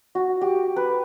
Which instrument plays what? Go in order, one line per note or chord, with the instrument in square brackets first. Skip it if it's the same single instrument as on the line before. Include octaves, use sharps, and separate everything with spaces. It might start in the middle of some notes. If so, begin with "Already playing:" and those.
[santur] F#4
G4
B4